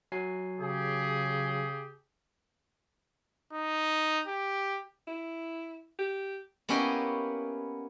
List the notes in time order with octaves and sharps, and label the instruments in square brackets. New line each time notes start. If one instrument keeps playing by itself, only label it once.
[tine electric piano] F#3 G#5 C7
[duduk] C#3 [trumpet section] G4 G#4
[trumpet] D#4
G4
[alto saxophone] E4
G4
[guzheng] A#3 B3 C#4 E4 G4 D#5